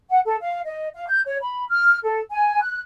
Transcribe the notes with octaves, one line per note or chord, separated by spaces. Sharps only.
F#5
A4
F5
D#5
F5
G6
C#5
B5
F6
A4
G#5
F#6